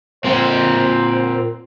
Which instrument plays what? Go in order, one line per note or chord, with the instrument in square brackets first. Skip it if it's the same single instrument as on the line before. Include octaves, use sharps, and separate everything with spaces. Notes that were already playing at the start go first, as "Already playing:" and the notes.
[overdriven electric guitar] A#2 C4 [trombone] C5